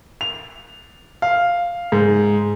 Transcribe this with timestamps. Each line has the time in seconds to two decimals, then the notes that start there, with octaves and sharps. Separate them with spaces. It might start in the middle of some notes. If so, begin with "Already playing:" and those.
0.21 F7
1.22 F5
1.92 G#2